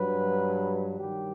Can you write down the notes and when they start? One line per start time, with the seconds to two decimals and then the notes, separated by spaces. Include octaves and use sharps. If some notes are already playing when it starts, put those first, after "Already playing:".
Already playing: G2 F#3 B4
0.98 G2 D#3 G3 G4